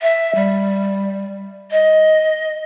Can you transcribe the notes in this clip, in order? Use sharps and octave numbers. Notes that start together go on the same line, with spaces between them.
E5
G3
D#5